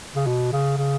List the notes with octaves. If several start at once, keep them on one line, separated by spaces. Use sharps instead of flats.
C#3
B2
C#3
C#3